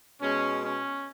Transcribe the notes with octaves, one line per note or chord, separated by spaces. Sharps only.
B2 G#3 C#4
C#4